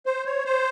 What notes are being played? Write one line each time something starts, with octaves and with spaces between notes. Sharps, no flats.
C5
C#5
C5